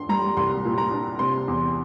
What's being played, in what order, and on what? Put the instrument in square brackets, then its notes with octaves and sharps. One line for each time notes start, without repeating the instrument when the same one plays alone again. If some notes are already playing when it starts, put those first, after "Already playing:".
Already playing: [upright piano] D4 C6
G3 A#5
C2 C6
A#2
A#5
D4
C3 C6
E2